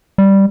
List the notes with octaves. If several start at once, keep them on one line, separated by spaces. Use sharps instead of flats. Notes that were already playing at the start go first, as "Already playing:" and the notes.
G3